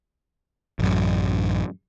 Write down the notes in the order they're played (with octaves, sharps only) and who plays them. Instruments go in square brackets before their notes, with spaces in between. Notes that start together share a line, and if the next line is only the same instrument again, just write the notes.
[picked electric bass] A1 F#2